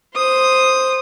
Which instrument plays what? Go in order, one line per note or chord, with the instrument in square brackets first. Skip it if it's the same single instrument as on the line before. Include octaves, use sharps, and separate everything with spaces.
[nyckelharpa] C5 D#6